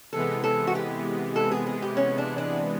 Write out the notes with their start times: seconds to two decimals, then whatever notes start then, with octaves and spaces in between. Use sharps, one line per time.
0.13 C3 E3 G#3 B3 A4
0.44 A4
0.67 F#4
0.75 G4
1.36 A4
1.52 G#4
1.67 G#4
1.82 G4
1.97 C#4
2.18 D4
2.38 D4